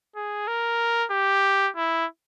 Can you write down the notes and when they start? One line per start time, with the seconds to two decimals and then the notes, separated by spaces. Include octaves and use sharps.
0.15 G#4
0.47 A#4
1.11 G4
1.76 E4